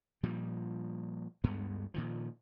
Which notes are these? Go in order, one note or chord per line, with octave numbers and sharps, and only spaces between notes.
A#2 F3 G3
D2 G2 G#3 B3
A#2 D#3 F3